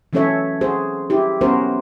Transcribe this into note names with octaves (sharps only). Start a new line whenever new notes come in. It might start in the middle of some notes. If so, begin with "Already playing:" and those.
E3 F#3 C#4 A4 C#5 E5
F#4 G#4 C5
E4 G4
F#3 B3 C#4 F#4 A#4 C5